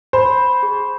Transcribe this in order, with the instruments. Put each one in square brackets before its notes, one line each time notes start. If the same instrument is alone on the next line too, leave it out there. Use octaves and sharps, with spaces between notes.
[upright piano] C5 [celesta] B5
[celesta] B5
G#4